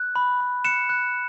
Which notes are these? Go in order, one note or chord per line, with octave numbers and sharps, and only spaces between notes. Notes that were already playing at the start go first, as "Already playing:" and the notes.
Already playing: F#6
B5
B5
F#6 C#7 E7
F#6